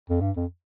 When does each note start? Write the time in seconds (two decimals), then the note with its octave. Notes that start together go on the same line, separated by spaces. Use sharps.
0.10 F2
0.21 G2
0.37 F2